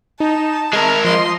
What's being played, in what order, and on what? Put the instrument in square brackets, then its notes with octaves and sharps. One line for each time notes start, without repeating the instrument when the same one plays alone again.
[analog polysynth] D#4 [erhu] A5
[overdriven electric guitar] G#3 A#4 [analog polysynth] E5 G#6
[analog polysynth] F3 D#5 [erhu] C6